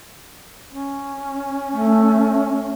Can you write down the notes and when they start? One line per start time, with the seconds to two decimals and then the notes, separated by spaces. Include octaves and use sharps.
0.72 C#4
1.73 A3